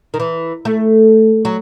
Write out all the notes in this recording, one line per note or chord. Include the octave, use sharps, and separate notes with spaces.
D#3
E3
A3
F#3